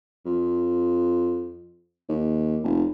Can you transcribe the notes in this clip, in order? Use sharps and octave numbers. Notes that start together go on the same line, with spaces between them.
F2
D#2
F1